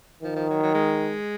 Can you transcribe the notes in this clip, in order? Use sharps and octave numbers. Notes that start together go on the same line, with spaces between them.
D#3 F3
F3
F#3
F#3
G#3